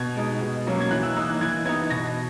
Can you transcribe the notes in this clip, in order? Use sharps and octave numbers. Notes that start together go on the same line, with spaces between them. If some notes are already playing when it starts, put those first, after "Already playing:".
Already playing: B2 G#6
G#3 D#4
B2
F#3 A#3 C#4
G#6
E3 F#6
E6
A#3 D#4 E6
F#6
E3 G#6
B3 D#4 G#6
B2 A#6